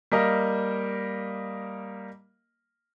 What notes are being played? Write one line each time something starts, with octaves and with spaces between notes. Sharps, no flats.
G3 A#3 A#4 D#5 F5